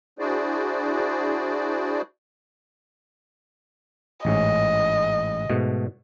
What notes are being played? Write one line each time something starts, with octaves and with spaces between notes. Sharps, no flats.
D4 E4 F#4 G#4 C5 D5
A1 G#2 C#4 D#5
G#2 B2 A3